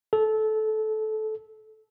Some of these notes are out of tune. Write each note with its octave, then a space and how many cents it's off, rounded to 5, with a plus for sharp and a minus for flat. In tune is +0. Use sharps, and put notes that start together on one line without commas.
A4 -20